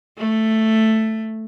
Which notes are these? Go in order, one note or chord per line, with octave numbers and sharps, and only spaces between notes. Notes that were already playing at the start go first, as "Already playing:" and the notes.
A3